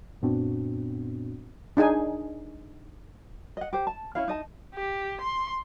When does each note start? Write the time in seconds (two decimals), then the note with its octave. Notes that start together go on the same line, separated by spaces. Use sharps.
0.22 F#2 A#2 B3 C4 D4 F#4
1.77 D4 D#4 G#4 G#5
3.57 D#5 F#5
3.73 G4 C5
3.87 A5
4.15 C#4 E4 F5
4.28 D#4 D#5 A5
4.74 G4
5.21 C6